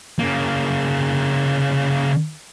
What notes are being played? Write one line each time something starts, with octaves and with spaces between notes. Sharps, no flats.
C#3 A#3